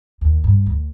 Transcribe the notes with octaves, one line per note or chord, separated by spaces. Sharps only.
D#2
G2
D2